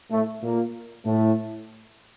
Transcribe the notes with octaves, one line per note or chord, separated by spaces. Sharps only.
A2 A3
A#2 A#3
A2 A3